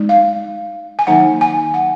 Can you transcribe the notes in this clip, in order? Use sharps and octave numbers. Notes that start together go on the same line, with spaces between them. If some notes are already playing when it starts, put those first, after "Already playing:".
Already playing: G#3 D#4
F5
G#5
D#3 F#3 A#3 D#4 F#5
G#5
F#5